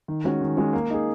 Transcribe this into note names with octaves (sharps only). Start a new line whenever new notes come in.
D#3
G#3 C#4 F#4
D#3
G#3 C#4 F#4
A#3
D#4 G#4